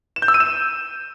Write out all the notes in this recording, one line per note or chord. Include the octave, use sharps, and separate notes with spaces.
E7
G6
E6
D#7
E7